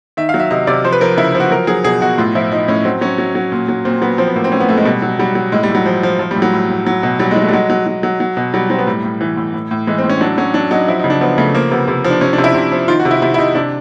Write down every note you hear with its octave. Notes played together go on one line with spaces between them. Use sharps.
D#3 E5
F5
F#3
E5
C3 D#5
C3 D5
F3 C5
B4
F3 A#4
C#3 E4
F3
F#4
F#3 A#4
F#3 G#4
B2 G#4
B2 F#4
A2 F4
F3 E4
F3 D#4
A2 C#4
F#3 C4
F#3 C#4
F#3
F#3
A#2
F#3
A#2 C4
F#3 B3
F3 C4
B3
A2 A#3
C4
A2 C#4
B3
A2 A3
G#3
B2 G3
F#3
F#3 G3
F#3
A2 G#3
G3
A2
F#3
F3
F3
F3
G3
A2
F#3
A2
A2
F#3
B2
F#3 G3
G#3
F#3
A3
G3
F#3 G#3
F#3
F#3
F#3
F#3
B2
F#3 G3
F#3 C4
B3
A2 G3
A2
E3
A2
A2
A2
E3 G#3
C4
A2
C#4
F#3 D4
F#3 C#4
F#3 D4
F#3 D#4
F3 E4
D#4
C#3
D4
F3 B3
C#3 A3
F3 A#3
C3 B3
C3
F3
D4
C3 C#4
D4
C3
E4
C3
F3
D#3 F4
F#4
C3
E4
C3 E4
E4
C3 D#4
C3 D4